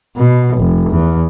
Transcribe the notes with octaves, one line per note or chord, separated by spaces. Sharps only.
B2
F1
E2